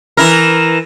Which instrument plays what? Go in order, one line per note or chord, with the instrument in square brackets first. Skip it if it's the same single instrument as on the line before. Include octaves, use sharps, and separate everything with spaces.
[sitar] E3 E4 A#4